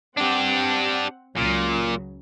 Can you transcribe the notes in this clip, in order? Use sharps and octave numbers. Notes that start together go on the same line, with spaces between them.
C4 D4 G4 F#5
C#2 A#2 C#3 F#3